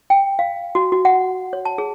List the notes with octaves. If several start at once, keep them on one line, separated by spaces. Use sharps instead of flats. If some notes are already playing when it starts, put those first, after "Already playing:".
G5
F5
F#4
F#4
F#5
C#5
A5
G#4